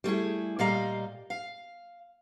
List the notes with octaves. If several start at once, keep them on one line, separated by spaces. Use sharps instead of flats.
G3 A3 E4 G#4
A#2 G3 D5 D#5 F5 A#5
F5